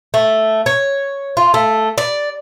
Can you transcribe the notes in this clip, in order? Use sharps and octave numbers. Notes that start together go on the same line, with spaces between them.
A3
C#5
F4
A3
D5